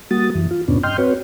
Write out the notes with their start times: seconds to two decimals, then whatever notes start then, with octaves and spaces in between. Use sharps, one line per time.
0.11 G3 A#3 F#4 D#6 A6
0.35 F#2 E3
0.51 F4
0.68 E2 G#2 C3 B3 C#4 D4
0.83 G2 D#5 G5 C6 F6 G6
0.98 C4 F#4 B4 C#5